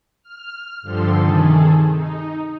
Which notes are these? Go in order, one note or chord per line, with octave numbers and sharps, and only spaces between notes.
F6
G2 D3 F3 G3 A4 C6
C3 D#3 G#4 A4
D#4